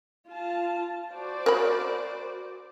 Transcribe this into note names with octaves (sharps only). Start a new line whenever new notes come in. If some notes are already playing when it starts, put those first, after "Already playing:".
F4 A5
F#4 C5 D5
A#4 C#5 B5